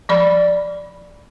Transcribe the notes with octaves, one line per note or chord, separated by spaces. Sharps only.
F3 D5 B5